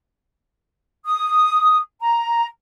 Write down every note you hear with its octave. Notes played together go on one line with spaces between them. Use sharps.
D#6
A#5